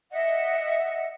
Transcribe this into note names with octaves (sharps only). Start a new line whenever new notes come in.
D#5 E5 F#5